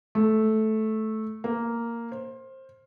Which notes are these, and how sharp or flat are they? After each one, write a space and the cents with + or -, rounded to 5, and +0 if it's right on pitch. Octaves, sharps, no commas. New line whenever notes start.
A3 -10
A#3 -5
C5 +20